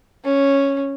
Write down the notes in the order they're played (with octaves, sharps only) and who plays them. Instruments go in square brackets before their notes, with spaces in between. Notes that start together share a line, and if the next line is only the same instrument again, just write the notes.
[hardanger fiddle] C#4